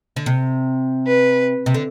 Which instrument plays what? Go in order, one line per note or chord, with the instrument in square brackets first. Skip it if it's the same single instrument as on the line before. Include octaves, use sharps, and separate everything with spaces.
[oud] D3
C3
[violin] B4
[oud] C3
D3